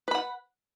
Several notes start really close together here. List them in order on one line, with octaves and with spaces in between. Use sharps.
B4 B5 F#5